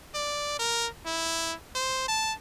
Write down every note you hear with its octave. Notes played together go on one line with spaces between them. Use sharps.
D5
A#4
E4
C5
A5